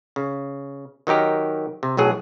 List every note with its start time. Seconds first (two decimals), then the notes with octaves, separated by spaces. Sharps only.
0.16 C#3
1.07 D#3 F#3 D#4 G4 A#4
1.83 C3
1.97 B1 A2 F#3 G#4